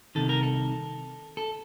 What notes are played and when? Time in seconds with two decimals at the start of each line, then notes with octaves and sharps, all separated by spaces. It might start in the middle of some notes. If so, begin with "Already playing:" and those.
0.15 C2 C3 D#3 A4
0.29 A#4
0.43 A4
1.37 A4